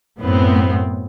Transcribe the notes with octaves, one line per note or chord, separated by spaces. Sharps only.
F#2 A2 B3 C4